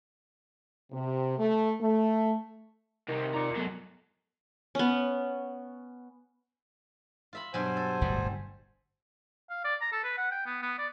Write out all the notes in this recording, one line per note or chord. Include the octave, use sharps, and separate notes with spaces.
C3
A3
A3
C2 C3 D#3 G3
D#4 F4 D5 A#5 D6
F#3 G#3 A3 B3 A4
B3 C#4
F4 E5 B5
G2 B2 F#3 C5 G#5
A4
D1 G1 G2 G3
F5
D5
A#5
A4
B4
F#5
G5
B3
B3
D5